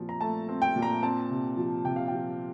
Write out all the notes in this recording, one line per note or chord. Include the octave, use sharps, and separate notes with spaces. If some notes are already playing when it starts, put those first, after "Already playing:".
Already playing: A#2 F3 C4
A#5
A3 A5
C4
G5
A#2
A#5
C4 A5
C3
F3
C3 G5
F5
F3 G5